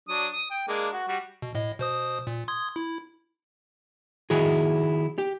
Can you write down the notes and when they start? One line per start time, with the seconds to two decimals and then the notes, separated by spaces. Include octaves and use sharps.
0.09 F#3 D4 D#6
0.33 D#6
0.51 G5
0.68 G#3 A#3 D4
0.93 F#4
1.08 G3 F#4
1.42 B2
1.55 A2 D#5
1.79 B2 C5 D#6
2.27 A#2
2.48 C6 D#6 G#6
2.76 E4
4.30 D#3 E4 F#4 G#4
5.18 G4